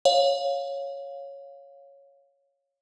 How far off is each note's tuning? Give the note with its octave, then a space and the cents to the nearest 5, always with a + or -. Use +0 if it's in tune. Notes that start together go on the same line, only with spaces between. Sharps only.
C#5 +0 F5 +10